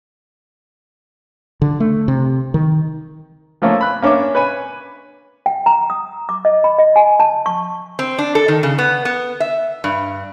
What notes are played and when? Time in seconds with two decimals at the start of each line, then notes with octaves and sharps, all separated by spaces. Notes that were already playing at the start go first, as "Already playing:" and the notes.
1.62 D3
1.80 A3
2.08 C3
2.54 D#3
3.62 F3 A3 A#3 C#4
3.81 B5 F#6
4.02 A#3 C#4 D4 E5 D6
4.35 B4 C#5 G#5 B5
5.46 G5
5.66 A#5
5.90 D#6
6.29 D6
6.45 D#5
6.64 B5
6.78 D#5
6.96 G#5
7.20 A5
7.46 C#6
7.99 C4
8.18 D4
8.35 A4
8.48 D#3
8.63 C#3
8.78 B3
9.05 B3
9.40 E5
9.84 G2